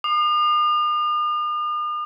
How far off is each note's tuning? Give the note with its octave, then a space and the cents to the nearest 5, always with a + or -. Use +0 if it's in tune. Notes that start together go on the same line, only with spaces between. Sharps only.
D#6 -45